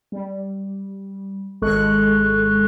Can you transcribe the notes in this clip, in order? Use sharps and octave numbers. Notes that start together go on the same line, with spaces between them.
G3
G#1 G#3 A4 C#6 F#6